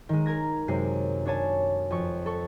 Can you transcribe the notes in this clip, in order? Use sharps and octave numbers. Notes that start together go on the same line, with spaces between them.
D#3 G#3
A#4 G#6 A#6
F#2 C3 G#3 C7
D4 C#5 G#5 A5
F2 C#6
A4 C#6